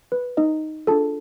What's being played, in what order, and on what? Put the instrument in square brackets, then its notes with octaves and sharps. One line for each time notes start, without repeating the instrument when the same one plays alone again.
[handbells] B4
D#4 D#5
D4 F4 G#4 A4 A5